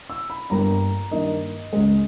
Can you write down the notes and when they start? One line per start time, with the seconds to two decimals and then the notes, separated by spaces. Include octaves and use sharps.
0.10 E6
0.30 B5
0.50 G1 G2 G3 A#3 A#5
1.11 G2 D#3 A#3 D#5
1.73 C#2 C#3 G#3